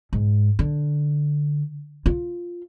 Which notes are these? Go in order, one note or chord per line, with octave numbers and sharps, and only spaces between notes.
G#2
D3
F4